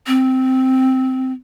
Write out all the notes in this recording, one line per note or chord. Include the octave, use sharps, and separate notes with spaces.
C4